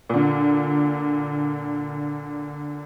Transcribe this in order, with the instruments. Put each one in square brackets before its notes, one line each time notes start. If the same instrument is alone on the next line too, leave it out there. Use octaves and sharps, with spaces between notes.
[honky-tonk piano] A#2 D3